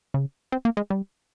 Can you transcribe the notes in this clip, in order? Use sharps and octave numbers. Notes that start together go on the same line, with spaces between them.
C#3
C4
A#3
G#3
G3